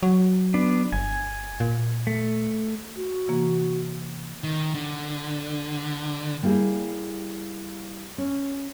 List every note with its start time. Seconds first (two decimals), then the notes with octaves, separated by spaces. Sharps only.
0.03 F#3
0.54 B3 D4
0.93 G1 G#5
1.60 A#2
2.07 A3
2.95 F#4
3.28 C3 E3 A#3
4.44 D#3
4.75 D3
6.42 G3 A#3 E4 G4 G#4
8.18 C#4